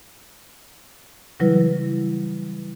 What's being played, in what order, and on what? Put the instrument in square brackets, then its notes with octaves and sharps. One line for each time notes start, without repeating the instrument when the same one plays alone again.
[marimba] C#3 E3 F#3 G3 E4 B4